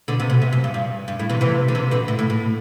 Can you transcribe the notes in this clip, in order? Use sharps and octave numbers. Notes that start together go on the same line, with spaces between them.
B2 D3
C3
B2
C3
F#2
G2
G2
G2
A2
C3 E3
C3 E3
D3
C3 E3
B2 D3
A2
A2
A2